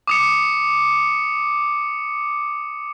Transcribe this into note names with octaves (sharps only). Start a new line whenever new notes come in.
D6 D#6 C#7